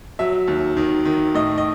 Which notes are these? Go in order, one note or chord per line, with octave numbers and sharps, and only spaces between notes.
F#3 E5
D#2
D#3
D#3
A2 D#5
D#5